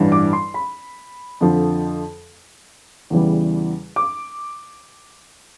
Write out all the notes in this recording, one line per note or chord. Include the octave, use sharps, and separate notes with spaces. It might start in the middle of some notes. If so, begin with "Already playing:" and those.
Already playing: A1 G2 E3 G3
D6
C6
B5
F2 D3 F3
E2 C#3 E3 G3
D6